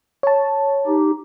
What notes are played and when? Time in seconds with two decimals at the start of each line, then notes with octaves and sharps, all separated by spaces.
0.23 C#5 A5
0.87 D#4 G4